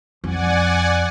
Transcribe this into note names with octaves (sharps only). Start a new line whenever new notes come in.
F2 D5 F#5 G#5